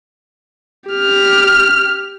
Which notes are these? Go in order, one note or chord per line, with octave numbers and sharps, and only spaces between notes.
G4 F6